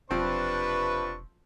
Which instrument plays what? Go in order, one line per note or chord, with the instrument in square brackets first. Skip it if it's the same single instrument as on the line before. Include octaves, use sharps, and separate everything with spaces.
[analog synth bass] E1 [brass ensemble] C3 B4 [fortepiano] F3 C4 [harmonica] D4 C#6